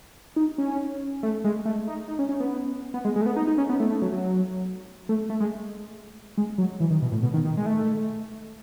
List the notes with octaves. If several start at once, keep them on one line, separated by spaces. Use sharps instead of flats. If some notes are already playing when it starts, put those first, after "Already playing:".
D#4
C#4
A3
G#3
A3
D#4
D#4
C#4
C#4
B3
B3
G#3
G#3
A3
B3
D#4
D#4
C#4
B3
A3
A3
F#3
F#3
A3
A3
G#3
G#3
F#3
E3
D#3
B2
A2
B2
D#3
D#3
G#3
A3